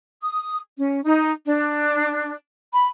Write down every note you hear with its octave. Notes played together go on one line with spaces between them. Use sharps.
D#6
C#4
D#4
D4
B5